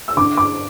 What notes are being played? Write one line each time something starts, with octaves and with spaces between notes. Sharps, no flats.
E6
D3 D6
D6